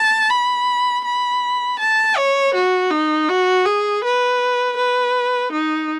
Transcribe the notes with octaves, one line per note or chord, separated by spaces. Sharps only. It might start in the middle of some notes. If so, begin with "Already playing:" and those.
Already playing: A5
B5
B5
A5
C#5
F#4
D#4
F#4
G#4
B4
B4
D#4